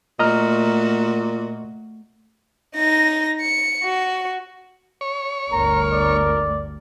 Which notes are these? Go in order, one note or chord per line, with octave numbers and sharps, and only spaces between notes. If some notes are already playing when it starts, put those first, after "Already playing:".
A#2 A3 F#4 D#5 A#5 F6
D#4 A#6
C#7
F#4
C#5
G1 D2 A#4 A#5
D5